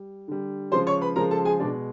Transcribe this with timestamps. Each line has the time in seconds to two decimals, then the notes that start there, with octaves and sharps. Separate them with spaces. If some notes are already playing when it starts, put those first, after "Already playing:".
Already playing: G3
0.28 D3 G3
0.72 C#3 F3 G#3 C5 C6
0.87 C#5 C#6
1.01 B4 B5
1.16 C#3 F3 G#3 A#4 A#5
1.31 A4 A5
1.45 G#4 G#5
1.60 B2 G#3 D4 D5